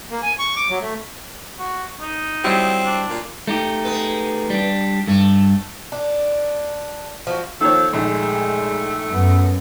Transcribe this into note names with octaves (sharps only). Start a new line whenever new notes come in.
A#3
G#5
C#6
D6
F#3
A3
F#4
D#4
F#3 G3 C4 E4
D4
A#2
A3 D#4 G4
G#3 B3 B4
G3 D4
G2 A3
D4
F3 F#4
D#3 F3 A#3 A4 C#5
A#1 D#3 G#3 A3
F#2 B3